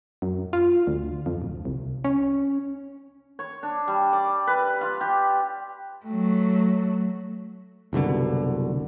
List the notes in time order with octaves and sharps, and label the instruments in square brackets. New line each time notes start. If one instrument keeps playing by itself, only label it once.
[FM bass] F#2
F4
D2
F2
D1
C2
C#4
[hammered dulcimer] C#5
D4
G3
D5
B4
F4
G4
[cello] F#3 A3
[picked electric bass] F#1 C2 B2 D3